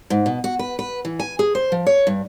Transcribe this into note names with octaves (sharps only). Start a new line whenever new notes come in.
G#2
B2
F#4
B4
B4
E3
G#5
G#4
C5
F3
C#5
G2